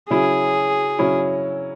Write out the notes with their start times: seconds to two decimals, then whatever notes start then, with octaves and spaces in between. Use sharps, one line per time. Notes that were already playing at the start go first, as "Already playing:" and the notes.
0.10 C#3 F#3 C#4 E4 G#4
0.99 C#3 F#3 C#4 E4